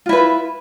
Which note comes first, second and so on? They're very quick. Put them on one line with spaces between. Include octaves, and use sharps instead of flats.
F4 E4 B4